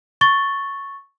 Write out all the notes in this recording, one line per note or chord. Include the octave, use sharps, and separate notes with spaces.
C#6 A6 G7